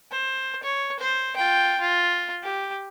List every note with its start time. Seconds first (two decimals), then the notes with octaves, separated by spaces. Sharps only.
0.11 C5
0.63 C#5
1.00 C5
1.36 F4 G5
1.80 F4
2.43 G4